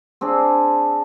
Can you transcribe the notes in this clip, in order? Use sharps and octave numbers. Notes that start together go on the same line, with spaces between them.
C4 D4 G#4 D5